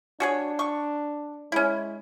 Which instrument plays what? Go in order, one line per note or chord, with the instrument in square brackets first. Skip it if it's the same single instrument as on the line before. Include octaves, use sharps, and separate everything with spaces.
[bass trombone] D4 [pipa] F#4 G#4 C#5
[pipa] C#6
[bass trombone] G#3 [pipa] C#4 E4